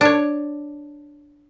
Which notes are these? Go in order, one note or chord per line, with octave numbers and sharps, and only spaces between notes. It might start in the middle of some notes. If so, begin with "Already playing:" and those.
D4 C#5